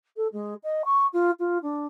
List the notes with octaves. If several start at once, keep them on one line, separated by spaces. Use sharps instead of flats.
A4
G#3
D#5
C#6
F4
F4
D4